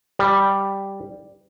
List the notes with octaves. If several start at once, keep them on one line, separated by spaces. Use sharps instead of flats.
G3